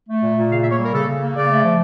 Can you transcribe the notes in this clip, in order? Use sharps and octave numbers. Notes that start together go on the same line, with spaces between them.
A3
A#2
A#2
C#3 F5
E5
A#3
C#5
G3 A#4
C#3 A4
C#3
A#3
C#3 D5
A3
F3